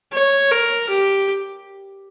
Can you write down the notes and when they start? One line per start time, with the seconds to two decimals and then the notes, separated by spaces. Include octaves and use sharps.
0.13 C#5
0.51 A#4
0.90 G4